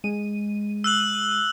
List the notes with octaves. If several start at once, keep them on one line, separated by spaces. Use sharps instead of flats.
G#3 D#7
E6 F#6 F#7